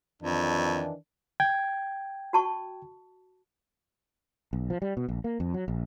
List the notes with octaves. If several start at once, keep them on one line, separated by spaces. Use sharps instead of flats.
F2 D#3 E3 D4
G5 G#6
F#4 A5 C#6
B1
F3
G3
B2
A#1
A#3
F2
F#3
A#1